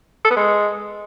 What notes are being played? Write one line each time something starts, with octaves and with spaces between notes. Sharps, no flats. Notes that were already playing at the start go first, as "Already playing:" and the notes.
A4
B3
G#3